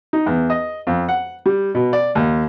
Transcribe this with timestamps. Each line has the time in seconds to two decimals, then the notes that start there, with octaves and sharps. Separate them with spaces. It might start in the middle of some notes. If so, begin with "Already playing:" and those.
0.13 D#4
0.26 E2
0.50 D#5
0.87 F2
1.09 F#5
1.46 G3
1.75 B2
1.93 D5
2.15 D#2